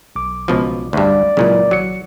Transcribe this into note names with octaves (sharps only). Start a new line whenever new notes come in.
B1 D6
C#2 B2 F3
D2 G2 D5
C#2 A#2 C#3 F#3 E4
G#1 F#3 C#7